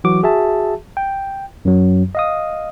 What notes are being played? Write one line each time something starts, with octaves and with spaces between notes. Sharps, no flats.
E3 F#3 F#4 D6
F#4 G#4 E5 A5
G5
F#2 F#3
D#5 F5 D#6